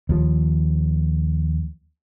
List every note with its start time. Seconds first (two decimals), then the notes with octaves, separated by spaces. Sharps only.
0.09 D#2 F3